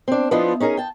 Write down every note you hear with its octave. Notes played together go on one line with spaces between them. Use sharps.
C4 D4
F3 B3 D4 E4 F4 D#5
C#4 D#4 G#4 A#4
G5 A5